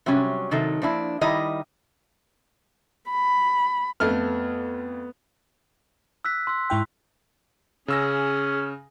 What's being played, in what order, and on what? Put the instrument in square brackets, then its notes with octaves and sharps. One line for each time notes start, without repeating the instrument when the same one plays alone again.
[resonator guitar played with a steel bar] C3 F#3 G3 C#4
C3 D#3 F#3 D#4 A4
F3 A#3 D4 E4
D#3 G3 E4 D#5 A#5
[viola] B5
[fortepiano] F2 A3 F6 [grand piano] B3
[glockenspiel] E6 F#6 B6
C6 E6
[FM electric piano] G#2 E4 G5
[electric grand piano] C#3 E6 A#6 [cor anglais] C#4 [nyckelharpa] G#4